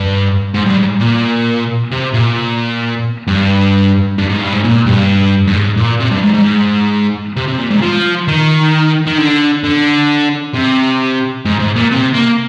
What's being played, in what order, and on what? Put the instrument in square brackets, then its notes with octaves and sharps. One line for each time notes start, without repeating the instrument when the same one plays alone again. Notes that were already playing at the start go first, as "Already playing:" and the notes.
Already playing: [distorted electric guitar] G2
G#2
G2
G#2
A#2
C3
A#2
G2
G2
G#2
G2
G#2
A#2
G2
G2
G#2
A#2
C3
G2
G#2
G#2
C3
C3
A#2
G#2
F3
D#3
D#3
D3
D3
C3
G#2
G#2
A#2
C3
A#3